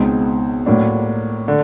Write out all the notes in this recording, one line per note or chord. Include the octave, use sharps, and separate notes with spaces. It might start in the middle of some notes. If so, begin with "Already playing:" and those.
Already playing: C#2 B2 G#3 C4 D#4
A2 F#3 A#3 D4
D3